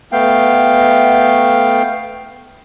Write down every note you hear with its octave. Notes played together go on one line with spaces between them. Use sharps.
A3 B3 F5 G5